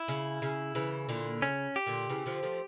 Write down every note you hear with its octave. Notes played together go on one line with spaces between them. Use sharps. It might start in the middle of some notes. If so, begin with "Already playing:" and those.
Already playing: E4
C#3
C#3
C#3 E3
A#2 D3
C#3 C#4
G4
A#2 D3
C#3 E3
D3 F3
F3 A3